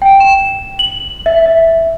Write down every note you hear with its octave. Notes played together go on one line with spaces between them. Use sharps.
G5
E7
F#7
E5
E5